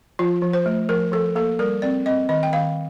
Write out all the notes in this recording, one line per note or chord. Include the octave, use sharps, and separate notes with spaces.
F3 F4
F3
C5
A3
F3 A#4
F3 A4
A#3 A4
G3 A#4
C4 D5
C4 D#5
D#3 D#5
G5
D#3 F5